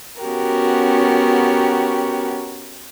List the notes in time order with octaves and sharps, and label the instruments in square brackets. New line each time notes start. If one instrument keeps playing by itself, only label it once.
[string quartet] B3 C#4 F#4 G4 A#4